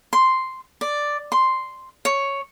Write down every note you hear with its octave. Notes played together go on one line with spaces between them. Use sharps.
C6
D5
C6
C#5